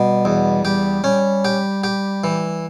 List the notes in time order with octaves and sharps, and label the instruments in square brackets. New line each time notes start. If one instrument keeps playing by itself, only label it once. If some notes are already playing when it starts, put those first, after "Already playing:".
Already playing: [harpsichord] B2 [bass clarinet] G3
[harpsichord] E2
[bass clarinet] G3 [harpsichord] G4
[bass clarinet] G3 [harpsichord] C#4
[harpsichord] G4
G4
E3